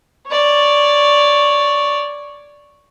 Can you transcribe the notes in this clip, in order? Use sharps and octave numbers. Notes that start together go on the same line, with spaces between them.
C#5 D5